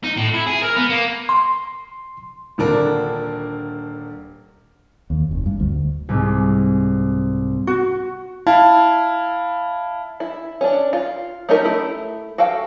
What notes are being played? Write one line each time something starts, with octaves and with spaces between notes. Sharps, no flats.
D#4
A2
E4
G#4
A#4
B3
A#3
C6
D#1 D3 D4 A#4
D#2
F1
G2
D2
C2 G#2
F#4
E4 F5 A5
E4
C#4 D4
F4
A3 C#4 D#4 G4 A#4
A3 E4
F#4 A4 F5 G5